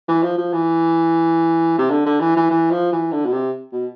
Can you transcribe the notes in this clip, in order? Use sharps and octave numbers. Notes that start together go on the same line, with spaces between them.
E3
F3
F3
E3
C3
D3
D3
E3
E3
E3
F3
E3
D3
B2
C3
B2